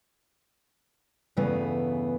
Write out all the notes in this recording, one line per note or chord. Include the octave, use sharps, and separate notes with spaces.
E2 G2 C#3 E3 A3 B3